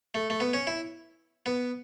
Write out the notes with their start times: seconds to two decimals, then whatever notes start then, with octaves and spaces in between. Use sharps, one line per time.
0.14 A3
0.30 A3
0.40 B3
0.53 C#4
0.67 E4
1.46 B3